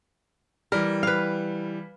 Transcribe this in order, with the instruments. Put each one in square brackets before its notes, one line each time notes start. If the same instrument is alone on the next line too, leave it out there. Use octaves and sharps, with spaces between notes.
[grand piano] E3 G3 [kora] A#4
[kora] B4 F5